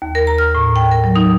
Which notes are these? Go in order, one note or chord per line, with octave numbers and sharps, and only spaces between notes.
D#2
A#4
A#5
F6
A2
G5
A#4
F#3
D#4